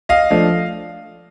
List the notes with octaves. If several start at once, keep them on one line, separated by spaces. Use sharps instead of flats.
D#5 F5
F3 A3 D4